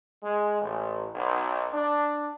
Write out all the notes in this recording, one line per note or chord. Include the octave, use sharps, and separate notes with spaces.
G#3
A1
B1
D4